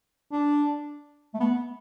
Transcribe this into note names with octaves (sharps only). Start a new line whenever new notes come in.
D4
A3
B3